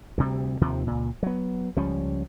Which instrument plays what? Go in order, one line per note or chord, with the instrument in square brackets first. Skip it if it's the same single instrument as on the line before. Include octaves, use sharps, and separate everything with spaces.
[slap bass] D2 C3 G3
D#2 C3 D#3 F3
C#2 A#2
F#3 B3
C#2 F3 G3 C#4